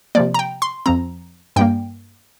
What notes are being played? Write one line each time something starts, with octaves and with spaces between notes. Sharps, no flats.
C3 F3 A#3 D5
A#5
G5
C6
F2 F3 C4 A#5
G2 G3 A#3 G5